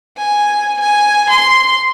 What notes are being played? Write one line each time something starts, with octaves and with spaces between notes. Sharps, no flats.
G#5
G#5
C6